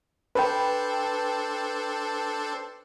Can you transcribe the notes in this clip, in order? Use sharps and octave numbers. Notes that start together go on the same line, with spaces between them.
D4 A4 B4 C5 G5